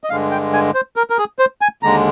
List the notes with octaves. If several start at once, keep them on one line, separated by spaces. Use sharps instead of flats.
D#5
G2 D3 G#3 F5
G5
G#5
C5
A#4
A#4
G#4
C5
G#5
D#2 D3 G#3 A#5